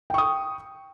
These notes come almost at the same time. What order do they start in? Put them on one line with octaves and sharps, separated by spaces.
G5 C#6 D#6